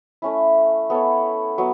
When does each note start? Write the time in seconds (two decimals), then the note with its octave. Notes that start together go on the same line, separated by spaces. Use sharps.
0.22 A3 C#4 E4
0.90 B3 A4 C#5
1.58 F#3 B3